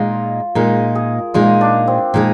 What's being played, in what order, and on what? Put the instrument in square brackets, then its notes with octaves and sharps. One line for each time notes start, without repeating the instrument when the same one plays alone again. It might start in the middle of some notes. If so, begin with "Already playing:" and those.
Already playing: [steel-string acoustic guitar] A#2 G#3 D#4 [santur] F4
[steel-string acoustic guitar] A#2 G#3 D#4 [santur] A#4
[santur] G#4
[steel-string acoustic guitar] A#2 G#3 D#4 [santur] F4
[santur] D4
C4
[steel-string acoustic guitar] A#2 G#3 D#4